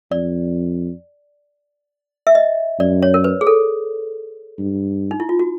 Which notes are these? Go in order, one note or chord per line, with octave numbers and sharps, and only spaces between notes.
F2 D5
E5
D#5
F#2 D5
C#5
A#4
B4
G#4
A4
G2
D#4
E4
F4
F#4